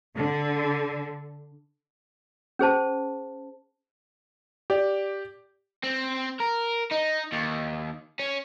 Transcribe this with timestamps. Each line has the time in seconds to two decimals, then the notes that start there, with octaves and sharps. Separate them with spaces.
0.15 D3
2.59 C#4 G#4 C5 A5
4.70 G4 D5
5.84 C4
6.40 A#4
6.92 D#4
7.32 D#2
8.19 C#4